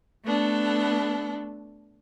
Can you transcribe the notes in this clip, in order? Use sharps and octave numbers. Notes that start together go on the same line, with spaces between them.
A3 B3 D4 A4